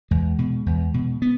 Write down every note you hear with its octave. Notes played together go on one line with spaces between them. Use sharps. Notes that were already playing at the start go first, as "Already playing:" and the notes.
E2 G#3
B2
E2
B2
B3